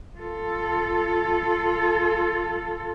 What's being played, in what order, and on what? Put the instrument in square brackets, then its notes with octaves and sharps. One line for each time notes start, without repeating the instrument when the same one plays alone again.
[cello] F4 A4